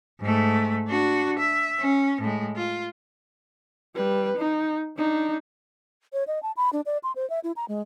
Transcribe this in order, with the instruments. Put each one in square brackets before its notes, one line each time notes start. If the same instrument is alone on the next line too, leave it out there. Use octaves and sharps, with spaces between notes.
[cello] G#2 A3
D4 F#4
E5
C#4
A2 G#3
F4
[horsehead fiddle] G3 B4
D#4
D4 D#4
[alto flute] C#5
D#5
A5
B5
D4
D5
C6
C5
E5
E4
A#5
G#3